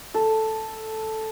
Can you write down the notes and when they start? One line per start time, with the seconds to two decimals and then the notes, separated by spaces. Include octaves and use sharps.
0.14 A4